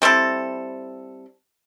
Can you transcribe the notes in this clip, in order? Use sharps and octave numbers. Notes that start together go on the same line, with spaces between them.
G3 C4 E4 A4